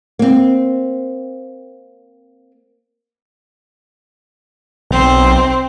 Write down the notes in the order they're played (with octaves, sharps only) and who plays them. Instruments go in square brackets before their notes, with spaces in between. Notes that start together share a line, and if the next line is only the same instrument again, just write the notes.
[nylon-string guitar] A#3 C4
[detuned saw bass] B1 [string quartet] C4